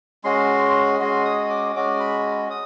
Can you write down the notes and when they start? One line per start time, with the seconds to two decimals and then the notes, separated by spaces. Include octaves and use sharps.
0.24 G#3 C#4 F#4 C6
0.99 G#3 C#4 F#4 C6
1.25 D#6
1.50 D6
1.75 G#3 C#4 F#4 D6
2.00 B5
2.51 D#6